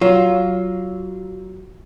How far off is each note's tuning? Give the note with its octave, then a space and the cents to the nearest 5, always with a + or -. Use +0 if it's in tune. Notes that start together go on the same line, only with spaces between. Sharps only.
F#3 +20 F4 +10